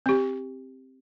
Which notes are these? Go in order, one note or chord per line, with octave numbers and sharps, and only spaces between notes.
C4 G4